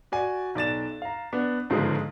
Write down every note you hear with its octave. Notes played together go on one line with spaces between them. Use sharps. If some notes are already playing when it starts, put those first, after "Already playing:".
F#4 D5 G#5
B1 D5 A6 E7
F5 A#5
B3 D4
G1 G#2 C#3 F3 G#3 G#4